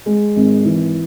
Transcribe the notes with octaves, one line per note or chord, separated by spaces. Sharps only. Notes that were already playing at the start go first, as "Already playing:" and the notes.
G#3
G#1
E3